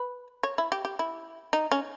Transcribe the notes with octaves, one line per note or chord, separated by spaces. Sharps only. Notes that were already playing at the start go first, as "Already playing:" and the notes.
Already playing: B4
C#5
E4
G4
G4
E4
D#4
C#4